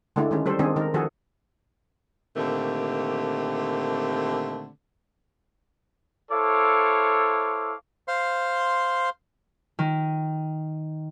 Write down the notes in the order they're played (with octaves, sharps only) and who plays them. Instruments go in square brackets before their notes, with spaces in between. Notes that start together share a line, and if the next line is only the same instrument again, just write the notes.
[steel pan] D3 G#3 A3 D4 E4
D#3 G#3 C#4
G3 A4 C5
D#3 G#3 C4 D4 G#4
D#3 D#4 A#4
D#3 F3 F#4 G#4 A4
[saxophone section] A#2 D3 D#3 A3 C4 G4
[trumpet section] E4 A4 C5 C#5 F5 D6
[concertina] C5 F5 C6
[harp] D#3